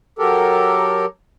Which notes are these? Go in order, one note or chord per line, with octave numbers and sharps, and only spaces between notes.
F#3 G4 A4 A#4